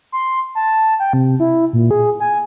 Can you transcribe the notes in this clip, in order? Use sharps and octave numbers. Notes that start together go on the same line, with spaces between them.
C6
A5
G5
C3
E4
A#2
G#4
G#5